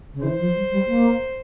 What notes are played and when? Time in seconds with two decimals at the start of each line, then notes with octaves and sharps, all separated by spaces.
0.14 C#3
0.22 E3 C5
0.39 F3
0.55 G3
0.71 G3
0.87 A#3